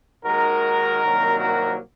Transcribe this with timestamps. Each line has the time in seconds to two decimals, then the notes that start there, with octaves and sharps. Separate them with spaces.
0.24 D#2 D#3 G#3 F#4 A#4
1.01 C2 C3 D#3 F#3 A#3
1.39 F#4 A#4